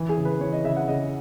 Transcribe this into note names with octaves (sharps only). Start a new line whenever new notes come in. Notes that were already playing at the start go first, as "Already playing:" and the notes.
Already playing: E3
G#4
C#3
B4
E3 C#5
D#5
C#3 E5
F#5
C#3 D#5